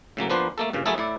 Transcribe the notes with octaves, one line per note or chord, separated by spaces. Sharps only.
A2 C#3 F#3 A#3
F3 A#3 B3 D4 B4 C5
A3 A#3 A4
G2 A#2 C#3
F#3 A3 A#3 E4 G#4 A4
A2 E4 D5